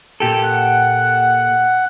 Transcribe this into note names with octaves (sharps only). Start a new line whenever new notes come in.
A#2 G4 A4
F#5